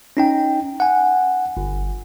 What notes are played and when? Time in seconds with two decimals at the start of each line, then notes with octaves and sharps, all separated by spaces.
0.17 C#4 D#4 G5
0.80 F#5 G#5
1.57 G1